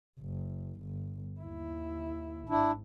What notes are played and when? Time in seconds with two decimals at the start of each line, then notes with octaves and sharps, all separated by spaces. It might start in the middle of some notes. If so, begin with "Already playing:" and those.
0.20 F#1
0.81 G1
1.41 D#2 E4
2.49 G#1 D4 E4